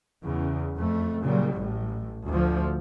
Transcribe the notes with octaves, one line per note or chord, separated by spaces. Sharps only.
E2 C#3
F2 A3
A#2 C#3 F#3 G3
A1 A2
D2 F3